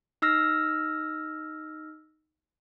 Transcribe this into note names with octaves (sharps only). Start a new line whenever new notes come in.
D#4 E6 F6 A#6